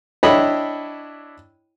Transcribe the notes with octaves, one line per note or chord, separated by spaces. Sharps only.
D4 E4 C#5 D#5 G5 B5